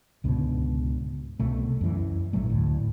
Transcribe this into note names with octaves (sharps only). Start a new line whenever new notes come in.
C#2 G#2 B2 D3
C2 B2 A3
F#2 E3
A#1 A2 F#3 A3
D2 A2